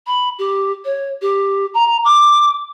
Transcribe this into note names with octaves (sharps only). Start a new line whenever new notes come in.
B5
G4
C#5
G4
A#5
D6